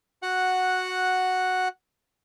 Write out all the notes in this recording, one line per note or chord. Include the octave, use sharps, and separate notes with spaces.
F#4 F#5